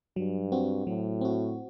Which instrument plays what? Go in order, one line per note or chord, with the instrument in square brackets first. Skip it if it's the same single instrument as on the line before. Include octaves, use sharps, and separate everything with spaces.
[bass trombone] G2 [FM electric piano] F#3
[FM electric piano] C4 F#4
[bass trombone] A2 [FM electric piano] F#3
[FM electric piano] C4 F#4